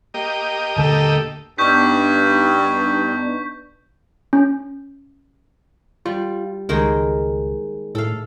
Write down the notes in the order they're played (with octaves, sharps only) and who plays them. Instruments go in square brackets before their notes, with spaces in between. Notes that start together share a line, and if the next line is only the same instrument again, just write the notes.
[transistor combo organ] A#3 G4 D#5
[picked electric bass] D#1 D3 A3 [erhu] A4
[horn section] G2 [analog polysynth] B3 D4 D#4 [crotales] C#6 G6 B6
[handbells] C#4
[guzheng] G3 [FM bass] F4
[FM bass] C#2 [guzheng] D#3 G#3 A#3
[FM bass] A2 [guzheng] A4 F5